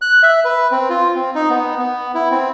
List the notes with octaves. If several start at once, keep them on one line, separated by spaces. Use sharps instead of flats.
F#6
E5
B4
C4
F4
C4
D#4
B3
B3
E4
C4